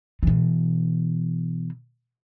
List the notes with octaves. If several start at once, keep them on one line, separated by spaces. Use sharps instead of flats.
B2 E3